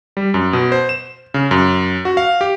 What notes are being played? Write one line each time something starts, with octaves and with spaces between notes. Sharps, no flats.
G3
F#2
B2
C5
E7
C#3
F#2
F#4
F5
G4